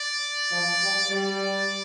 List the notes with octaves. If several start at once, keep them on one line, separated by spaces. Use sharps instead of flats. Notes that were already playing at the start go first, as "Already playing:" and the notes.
Already playing: D5
F3
G3
G3 D5